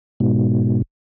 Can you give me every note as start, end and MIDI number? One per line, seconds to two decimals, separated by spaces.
0.20 0.82 44
0.20 0.82 47